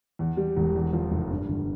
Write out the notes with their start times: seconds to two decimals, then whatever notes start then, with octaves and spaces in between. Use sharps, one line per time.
0.19 E2
0.37 G3
0.56 E1
0.75 E2
0.93 F3
1.11 F1
1.31 G2
1.48 G1